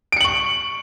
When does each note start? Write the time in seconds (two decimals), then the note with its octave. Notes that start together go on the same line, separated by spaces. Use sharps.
0.12 D7
0.16 C#7
0.21 F#7
0.25 C#6